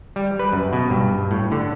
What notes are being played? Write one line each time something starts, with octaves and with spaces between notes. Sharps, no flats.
G3
B4
F#2
B2
G2
A2
D3